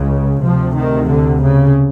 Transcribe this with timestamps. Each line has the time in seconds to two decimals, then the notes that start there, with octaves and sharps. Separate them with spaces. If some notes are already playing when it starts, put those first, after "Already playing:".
Already playing: C#2 C#3
0.43 D2 C3 F3
0.75 D#3
1.08 D3
1.42 C#3